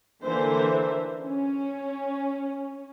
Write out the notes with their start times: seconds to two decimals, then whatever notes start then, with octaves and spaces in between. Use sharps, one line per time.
0.23 D3 E3 A#3 C5 E5
1.22 C#4